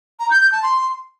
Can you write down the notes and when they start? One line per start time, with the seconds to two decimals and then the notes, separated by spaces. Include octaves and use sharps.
0.20 A#5
0.30 G6
0.41 G6
0.52 A5
0.63 C6